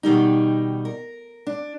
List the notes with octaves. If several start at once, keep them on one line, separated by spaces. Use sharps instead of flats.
B2 D#3 G3 D#4
A#4
D4